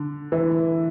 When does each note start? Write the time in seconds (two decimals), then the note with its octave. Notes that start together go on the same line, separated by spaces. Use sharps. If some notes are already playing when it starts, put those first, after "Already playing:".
Already playing: D3
0.32 E3